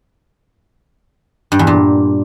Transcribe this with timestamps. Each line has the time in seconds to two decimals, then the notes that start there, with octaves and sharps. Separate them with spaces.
1.52 G2
1.59 E2
1.67 A#2